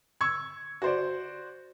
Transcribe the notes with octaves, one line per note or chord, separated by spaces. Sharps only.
C#6 E6 G#6
F#4 C5 D5